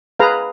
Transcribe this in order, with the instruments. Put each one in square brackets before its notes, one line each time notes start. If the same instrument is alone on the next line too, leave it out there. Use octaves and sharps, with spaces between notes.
[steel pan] G#4 B4 F5 A#5